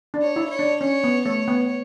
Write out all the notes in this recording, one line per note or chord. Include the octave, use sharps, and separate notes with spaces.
D4
C#5
E4
C#5
D4
C#4 C#5
B3
A3 C#5
B3